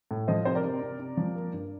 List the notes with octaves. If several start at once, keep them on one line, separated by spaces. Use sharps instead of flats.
A2
F3 C5 D#5
C3 C5
A#4 D5
C3
C3
C3
F3
A#3
G2